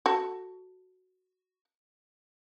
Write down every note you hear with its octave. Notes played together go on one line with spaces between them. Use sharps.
F#4 A4